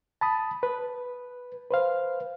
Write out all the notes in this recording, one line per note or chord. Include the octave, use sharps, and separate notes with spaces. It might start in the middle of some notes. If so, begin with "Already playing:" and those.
A5 B5 D#6
B4
B4 C5 F5